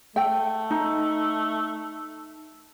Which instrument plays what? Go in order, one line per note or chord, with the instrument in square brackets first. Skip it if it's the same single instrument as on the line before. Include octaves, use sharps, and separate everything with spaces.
[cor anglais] A3 [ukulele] G5
[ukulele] D#4